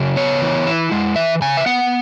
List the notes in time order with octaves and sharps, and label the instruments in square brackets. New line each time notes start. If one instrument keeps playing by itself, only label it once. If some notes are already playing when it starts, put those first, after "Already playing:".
Already playing: [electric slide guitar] C#3 F#3
B3 C#5
E3
E4
G#3
E3 E5
C#3 G#5
E5
B3 F#5